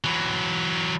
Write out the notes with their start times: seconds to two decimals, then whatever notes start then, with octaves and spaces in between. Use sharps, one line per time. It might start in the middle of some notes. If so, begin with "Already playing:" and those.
0.04 E3 F#3